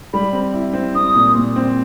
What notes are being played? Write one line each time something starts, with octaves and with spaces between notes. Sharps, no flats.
G3 B5
C4
E4
C4
C4 D#6
A#2
A#2
C4